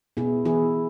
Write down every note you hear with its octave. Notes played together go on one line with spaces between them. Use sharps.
B2 B3 E4 G#4
E3 B3 E4 G#4